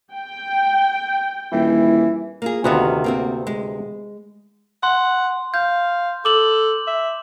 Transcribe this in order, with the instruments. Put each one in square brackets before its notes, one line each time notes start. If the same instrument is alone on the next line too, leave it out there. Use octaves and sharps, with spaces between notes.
[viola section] G5
[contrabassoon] D#1 [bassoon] E3 [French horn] E4
[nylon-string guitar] A#3 F4 G#4
[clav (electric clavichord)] D2 C3 B3 [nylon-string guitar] D#3 F4 F#4
[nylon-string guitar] A#3 C4 F#4
G#3
[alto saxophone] F#5 [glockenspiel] C6
[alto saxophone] F5 [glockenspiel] G6
[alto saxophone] A4 [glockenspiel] D6 F#7
[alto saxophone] E5